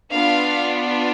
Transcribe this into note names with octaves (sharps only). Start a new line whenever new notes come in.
B3 D4 F4 F5